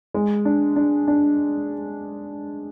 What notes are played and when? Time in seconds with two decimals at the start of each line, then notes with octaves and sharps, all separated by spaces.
0.14 G#3
0.45 D4
0.76 D4
1.08 D4